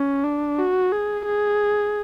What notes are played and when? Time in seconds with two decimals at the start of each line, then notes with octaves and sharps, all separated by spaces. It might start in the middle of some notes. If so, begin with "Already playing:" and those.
Already playing: C#4
0.24 D4
0.59 F#4
0.92 G#4
1.26 G#4